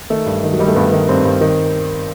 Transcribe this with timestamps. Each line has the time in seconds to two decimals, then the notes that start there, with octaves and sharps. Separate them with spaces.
0.10 D#3 A3
0.26 G2
0.43 D#3
0.52 F#3
0.59 D#3 G3
0.68 A3
0.75 G2 B3
0.92 D#3
1.09 G2 C4
1.25 G2
1.41 D#3